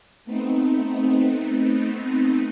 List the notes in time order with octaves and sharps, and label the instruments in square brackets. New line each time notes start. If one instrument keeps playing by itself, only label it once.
[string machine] A3 B3 C4 D#4